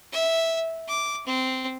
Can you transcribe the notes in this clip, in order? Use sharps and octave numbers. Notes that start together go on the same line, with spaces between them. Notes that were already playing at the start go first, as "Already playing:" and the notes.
E5
D6
C4